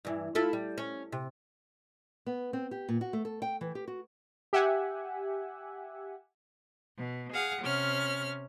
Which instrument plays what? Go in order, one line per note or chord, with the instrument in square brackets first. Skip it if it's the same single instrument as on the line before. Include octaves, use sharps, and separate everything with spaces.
[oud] G2 E3
E4 F4 A4
G3
C#4
C3
[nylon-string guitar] B3
C4
G4
A#2
F#4
A3
A4
G5
E3
G4
F#4
[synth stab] G4 E5 F#5 G#5
[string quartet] B2
G#4 F5 F#5
C3 C#4 F6